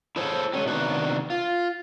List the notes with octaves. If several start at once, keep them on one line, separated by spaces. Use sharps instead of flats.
E4 G#4 A4 C5 C#5
F#3 G#3 C#4 G4
C3 D#3 B3 D4 F#4
F4